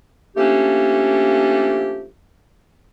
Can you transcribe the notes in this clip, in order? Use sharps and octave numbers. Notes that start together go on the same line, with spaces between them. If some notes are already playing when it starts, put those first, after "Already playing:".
F3 A3 A#3 C#4 D4 G4